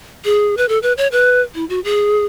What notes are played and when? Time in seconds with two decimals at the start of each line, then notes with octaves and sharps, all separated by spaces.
0.25 G#4
0.57 B4
0.69 A4
0.83 B4
0.97 C#5
1.12 B4
1.55 E4
1.70 F#4
1.84 G#4